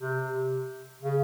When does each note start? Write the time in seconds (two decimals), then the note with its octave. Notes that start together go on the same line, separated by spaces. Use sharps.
0.01 C3
1.02 C#3